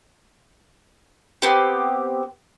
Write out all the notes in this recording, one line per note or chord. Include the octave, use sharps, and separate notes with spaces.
B3 C4 G4